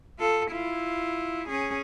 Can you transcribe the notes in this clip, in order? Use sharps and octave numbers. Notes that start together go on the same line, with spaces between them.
F4 A4
E4 F4
C#4 G#4